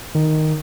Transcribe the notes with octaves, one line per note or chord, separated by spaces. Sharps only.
D#3